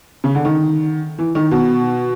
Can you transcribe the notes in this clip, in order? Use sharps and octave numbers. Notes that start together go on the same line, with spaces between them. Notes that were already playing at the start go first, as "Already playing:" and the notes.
C#3
D3
D#3
E3
D#3
B2